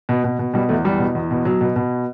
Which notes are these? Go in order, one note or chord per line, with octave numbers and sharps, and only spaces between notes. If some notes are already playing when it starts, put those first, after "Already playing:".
B2
B2
B2
B2 G3
E2 A3
E2 G3
B2
E2
B2
B2 F#3
B2
B2